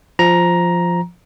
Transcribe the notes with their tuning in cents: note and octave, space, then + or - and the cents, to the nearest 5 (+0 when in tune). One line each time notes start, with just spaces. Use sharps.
F3 +0 A#5 +10